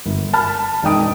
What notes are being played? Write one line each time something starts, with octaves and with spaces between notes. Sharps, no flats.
G1
A5 B5 F6
E1 D#4 G5 D#6 D7